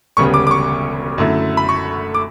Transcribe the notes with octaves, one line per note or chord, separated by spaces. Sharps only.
E1 D2 C#3 G3 B3 C#6
D6
D6
C#6
F#2 D3 A3 E4
B5
C#6
D6